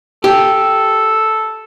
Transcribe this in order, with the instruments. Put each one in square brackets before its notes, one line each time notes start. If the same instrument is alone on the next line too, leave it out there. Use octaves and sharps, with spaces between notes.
[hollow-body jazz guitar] G4 [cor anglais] A4